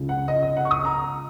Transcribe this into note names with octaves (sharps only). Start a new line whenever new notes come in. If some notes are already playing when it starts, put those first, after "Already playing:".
Already playing: C#2 C#3
F#5
D#5
D#5
F#5
C#6
D#6
A#5